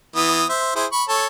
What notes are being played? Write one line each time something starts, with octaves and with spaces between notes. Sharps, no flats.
E3 B3 D#6
C5 E5
E4 G#4 C5
B5 C#6
A4 C#5